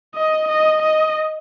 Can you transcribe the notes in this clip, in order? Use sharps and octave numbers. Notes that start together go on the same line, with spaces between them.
D#5
D#5
D#5